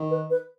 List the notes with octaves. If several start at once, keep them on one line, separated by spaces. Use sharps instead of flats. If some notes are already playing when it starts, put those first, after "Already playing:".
Already playing: D#3
B4
B4